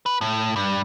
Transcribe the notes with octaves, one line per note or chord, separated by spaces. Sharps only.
B4
A2
G2